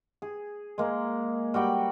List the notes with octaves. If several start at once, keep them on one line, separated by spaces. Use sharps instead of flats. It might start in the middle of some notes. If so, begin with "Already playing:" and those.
G#4
G#3 A#3
G3 F#4 G5 B5